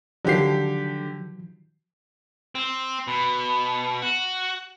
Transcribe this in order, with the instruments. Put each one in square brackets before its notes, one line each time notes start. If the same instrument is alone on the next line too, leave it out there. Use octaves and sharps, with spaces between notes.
[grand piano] D3 G4 C7 [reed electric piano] D#3 F3 F#3
[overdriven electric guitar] C4
B2
F#4